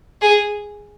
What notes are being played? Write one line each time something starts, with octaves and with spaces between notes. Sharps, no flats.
G#4